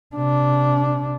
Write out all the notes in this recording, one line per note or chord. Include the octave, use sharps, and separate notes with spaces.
C3 D4